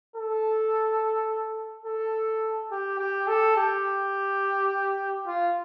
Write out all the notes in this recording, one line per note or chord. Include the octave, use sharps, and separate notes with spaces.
A4
A4
G4
G4
A4
G4
F4